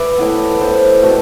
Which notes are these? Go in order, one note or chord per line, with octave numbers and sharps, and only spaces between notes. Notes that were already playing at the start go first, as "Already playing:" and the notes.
Already playing: B4 D5 E5
A2 E3 B3
A2 E3 B3 C5
B2 A3 C4